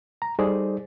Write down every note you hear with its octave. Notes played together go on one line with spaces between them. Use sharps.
A#5
G3 D#4 G#4 A4 C5 D5